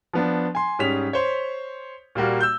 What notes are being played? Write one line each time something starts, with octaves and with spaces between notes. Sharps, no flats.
F3 B3 D4
G#5 C6
G#2 G3 C#4 G#4 B6 F7
C5 C#5
A#2 G3 A#3 F#4
E6 G6